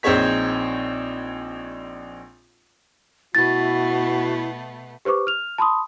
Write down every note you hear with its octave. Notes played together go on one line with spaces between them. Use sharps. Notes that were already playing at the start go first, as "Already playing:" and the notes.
A#1 C4 D#4 G#4 C#5 B6
B2 A3 B3 E4 F#4 A6
G4 B4 C5 C#6 D6
F6 F7
A5 B5 C6 D#6